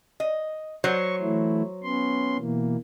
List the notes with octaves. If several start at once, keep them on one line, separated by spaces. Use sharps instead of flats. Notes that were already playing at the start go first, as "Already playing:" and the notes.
D#5
F#3 C5 C#5 C#6
E3 A3 E4
B3 C#4 C6
B2 E3 A#3